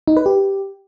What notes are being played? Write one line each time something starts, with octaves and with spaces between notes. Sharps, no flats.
D#4
B4
G4